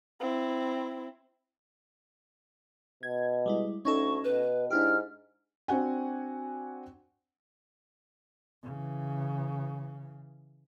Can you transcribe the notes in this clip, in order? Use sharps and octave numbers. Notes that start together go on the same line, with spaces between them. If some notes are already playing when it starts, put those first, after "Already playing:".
C4 E4
B2 G#6
G3 G#3 E4
D2 C#4 D#4 A4 C#6
B2 B4
G#2 D4 E4 G4 F6
C4 D4 F#4 F#5 G#5
C#3 E3